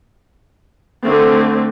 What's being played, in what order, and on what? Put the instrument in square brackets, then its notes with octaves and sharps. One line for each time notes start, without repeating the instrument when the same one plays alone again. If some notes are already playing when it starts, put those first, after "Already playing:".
[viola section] D3 A3 C4